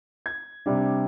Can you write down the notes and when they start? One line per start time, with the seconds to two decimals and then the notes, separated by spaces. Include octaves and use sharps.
0.26 G#6
0.66 C3 G3 D4